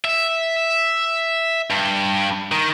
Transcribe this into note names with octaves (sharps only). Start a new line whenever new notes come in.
E5
G2
D#3